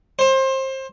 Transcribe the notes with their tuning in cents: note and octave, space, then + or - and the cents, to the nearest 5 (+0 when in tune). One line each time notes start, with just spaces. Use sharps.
C5 +25